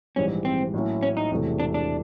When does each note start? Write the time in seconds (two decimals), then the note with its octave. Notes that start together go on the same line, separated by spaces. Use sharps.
0.16 A#1 G#2 E3 G3 C#4
0.45 C4
0.74 A2 F#3 A#3 C#4 E4
1.03 C#4
1.17 D#4
1.31 E1 E2 C3 E3 A3
1.60 D4
1.74 D4